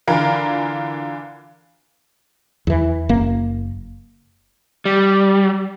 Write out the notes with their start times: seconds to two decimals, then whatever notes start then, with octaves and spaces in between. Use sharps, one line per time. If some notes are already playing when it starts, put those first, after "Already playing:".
0.07 D3 E3 F4 A#4
2.67 E2 E3
3.09 F#1 A#3
4.85 G3